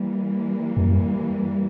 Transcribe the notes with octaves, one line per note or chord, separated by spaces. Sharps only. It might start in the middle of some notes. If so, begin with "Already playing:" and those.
Already playing: E3 G3 A#3
F2
F#2